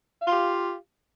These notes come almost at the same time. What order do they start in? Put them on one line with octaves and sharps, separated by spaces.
F5 F4 G4